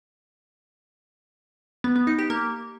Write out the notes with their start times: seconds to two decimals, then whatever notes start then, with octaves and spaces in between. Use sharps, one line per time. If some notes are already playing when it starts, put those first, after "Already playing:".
1.84 B3
1.96 B3
2.07 D#4
2.19 G4
2.30 A#3